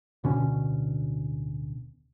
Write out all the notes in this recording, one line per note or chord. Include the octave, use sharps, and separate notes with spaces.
D1 B2 D3 C#4